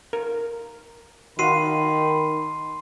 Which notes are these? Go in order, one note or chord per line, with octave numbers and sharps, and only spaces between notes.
A#4
D#3 F#4 F5 B5 C6 C7 D#7